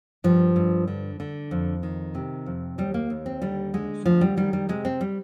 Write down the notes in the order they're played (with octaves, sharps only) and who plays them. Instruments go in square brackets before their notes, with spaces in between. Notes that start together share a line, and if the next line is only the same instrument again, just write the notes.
[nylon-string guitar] G2 F3
G2
D3
D3
F2
D#3
C3
F2
D#2 G3
A#3
D#2
C4
D3 G3
D3 G#3
D2 F3
G3
D#3 G3
G3
C3 G#3
C4
G3